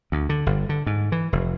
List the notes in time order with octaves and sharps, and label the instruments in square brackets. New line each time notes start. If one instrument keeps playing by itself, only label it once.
[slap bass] D2
D3
G1
D3
G#2
E3
F1